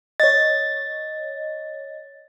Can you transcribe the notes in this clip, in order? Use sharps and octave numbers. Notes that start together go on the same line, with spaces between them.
C#5 D#5 A6